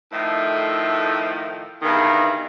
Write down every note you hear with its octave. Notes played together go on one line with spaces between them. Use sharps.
A2 D#3 F3 A3
E2 G2 D#3